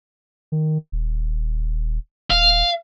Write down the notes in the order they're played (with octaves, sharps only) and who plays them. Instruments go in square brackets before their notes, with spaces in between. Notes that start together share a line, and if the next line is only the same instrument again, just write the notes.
[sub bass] D#3
D#1
[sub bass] D#1 [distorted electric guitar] F5